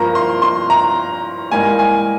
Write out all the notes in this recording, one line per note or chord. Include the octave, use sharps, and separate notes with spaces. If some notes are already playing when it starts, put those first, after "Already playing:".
Already playing: G2 F3 A#3 A#5
C6
C6
A#5
G#2 E3 G3 A#3 G#5
G#5